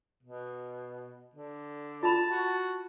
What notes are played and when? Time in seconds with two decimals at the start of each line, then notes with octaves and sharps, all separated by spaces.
0.23 B2
1.35 D3
2.03 F4 A5 B5
2.29 F#4